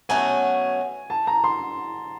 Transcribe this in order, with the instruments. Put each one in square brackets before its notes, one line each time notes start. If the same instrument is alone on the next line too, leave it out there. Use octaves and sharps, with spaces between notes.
[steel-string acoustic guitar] B2 F#3 A3 C#4 F#4 [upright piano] G#5
[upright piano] A5
A#5
C6